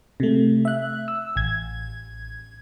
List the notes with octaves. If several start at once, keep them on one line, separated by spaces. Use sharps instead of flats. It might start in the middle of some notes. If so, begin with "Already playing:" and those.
C3 A3
E5 F#6
E6
A1 G#6